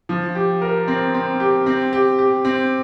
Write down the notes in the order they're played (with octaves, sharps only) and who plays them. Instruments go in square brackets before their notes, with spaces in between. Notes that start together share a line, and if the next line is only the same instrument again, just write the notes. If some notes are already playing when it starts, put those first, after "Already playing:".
[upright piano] F3
G4
A#4
C4
C4
G4
C4
G4
G4
C4